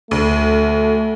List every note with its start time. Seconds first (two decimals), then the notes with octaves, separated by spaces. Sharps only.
0.11 D2 A3